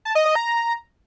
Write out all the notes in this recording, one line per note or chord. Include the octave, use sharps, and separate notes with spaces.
A5
D#5
D#5
A#5